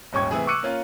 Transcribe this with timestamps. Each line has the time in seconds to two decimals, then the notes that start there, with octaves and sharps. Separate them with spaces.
0.13 D#1 G#2 C#4 G5 C#6 G#6
0.31 C3 E3 A3 E4 G#4
0.47 C#6 D6 E6 F#6 C#7 D#7
0.63 A#3 C#4 F4 F5